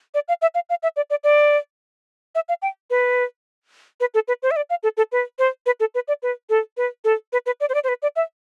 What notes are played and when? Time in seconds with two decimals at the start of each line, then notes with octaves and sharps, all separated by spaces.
0.14 D5
0.28 F5
0.42 E5
0.55 F5
0.70 F5
0.83 E5
0.96 D5
1.10 D5
1.24 D5
2.35 E5
2.49 F5
2.62 G5
2.90 B4
4.00 B4
4.14 A4
4.28 B4
4.43 C5
4.51 E5
4.56 D5
4.70 F5
4.83 A4
4.97 A4
5.12 B4
5.39 C5
5.66 B4
5.80 A4
5.95 B4
6.08 D5
6.23 B4
6.50 A4
6.77 B4
7.04 A4
7.33 B4
7.46 B4
7.60 D5
7.69 C5
7.74 D5
7.84 C5
7.89 B4
8.02 D5
8.16 E5